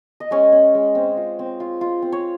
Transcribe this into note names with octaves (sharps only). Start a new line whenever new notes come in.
D#5
G#3 C#4 C#5
C#4
G#3
C4
F4
C4
F4
F4
C4
C#5